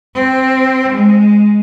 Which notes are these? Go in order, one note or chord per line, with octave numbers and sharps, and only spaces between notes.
C4
G#3